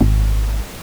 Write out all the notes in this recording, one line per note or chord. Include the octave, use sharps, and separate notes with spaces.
G#1